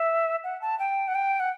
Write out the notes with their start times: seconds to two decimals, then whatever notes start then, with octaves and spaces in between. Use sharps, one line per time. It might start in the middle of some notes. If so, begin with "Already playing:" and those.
Already playing: E5
0.44 F#5
0.62 A5
0.79 G5
1.08 F#5
1.15 G5
1.40 F#5